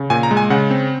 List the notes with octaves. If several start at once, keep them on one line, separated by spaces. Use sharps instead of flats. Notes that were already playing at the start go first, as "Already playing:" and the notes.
Already playing: C#3
A#2 G#5
A#5
G#3
G#5
C#3 F#5
C4